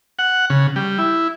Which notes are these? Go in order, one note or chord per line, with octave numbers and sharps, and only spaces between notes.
F#5
C#3
G3
E4